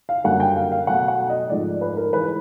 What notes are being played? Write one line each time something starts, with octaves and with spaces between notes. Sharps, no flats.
F5
F#2 D3 G3 A#3 F#5
G5
F5
F5
B2 F#3 A3 F#5
F#5
D#5
G#2 F3 A3 D5
B4
A#4
E3 G#3 B4